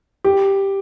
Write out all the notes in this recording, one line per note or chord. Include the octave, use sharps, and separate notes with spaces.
G4